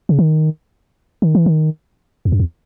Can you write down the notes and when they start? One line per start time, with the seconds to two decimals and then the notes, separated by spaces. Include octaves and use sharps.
0.09 C#3
0.19 D#3
1.22 D#3
1.35 E3
1.46 D#3
2.25 E2
2.32 F#2
2.40 E2